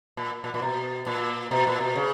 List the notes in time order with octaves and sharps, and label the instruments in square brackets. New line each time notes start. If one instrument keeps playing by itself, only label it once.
[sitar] A#2
A#2
A#2
B2
A#2
B2
A#2
B2
C#3